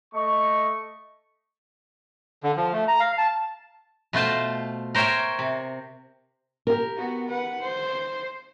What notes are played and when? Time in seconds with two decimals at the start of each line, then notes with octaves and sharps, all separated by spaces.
0.15 A3 D#5 C#6
2.44 D3
2.57 F3
2.73 A3
2.88 A#5
3.00 F5
3.18 A5
4.13 B2 A3 F4 C5 A5
4.95 A#4 C5 C#5 E5 G5
5.39 C3
6.67 G4 A#4
6.97 B3 F#4
7.28 B4 F#5
7.62 C5